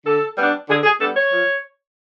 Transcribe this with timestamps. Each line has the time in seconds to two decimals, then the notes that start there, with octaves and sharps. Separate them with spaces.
0.06 D3 A4
0.37 G3 B3 D4
0.68 D3 G#4
0.84 G#4
0.99 G3 B3 D4 A4
1.15 C#5
1.31 F3